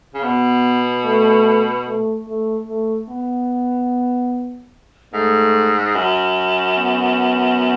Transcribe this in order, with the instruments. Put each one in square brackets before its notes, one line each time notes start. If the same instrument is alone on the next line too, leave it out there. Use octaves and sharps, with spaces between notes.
[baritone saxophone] C#3
[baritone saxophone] B2 [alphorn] B3
[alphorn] A3
A3
A3
A3
B3
[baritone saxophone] G#2 [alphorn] A3
[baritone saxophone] F#2
[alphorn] B3